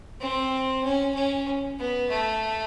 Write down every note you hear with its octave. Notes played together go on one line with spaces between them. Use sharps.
C4
C#4
C#4
B3
A3